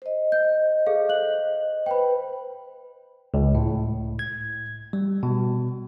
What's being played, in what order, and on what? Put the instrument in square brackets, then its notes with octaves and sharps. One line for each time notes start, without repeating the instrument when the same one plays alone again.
[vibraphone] C5 D#5
[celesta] G6
G#4 A4 F5
F5 F#6 F#7
[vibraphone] B4 C5 [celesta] G5 B5
[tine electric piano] C#2
A2
G#6
G3
B2